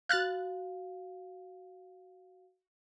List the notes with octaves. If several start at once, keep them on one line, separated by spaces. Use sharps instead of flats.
F#4 F5 F6 F#6 A6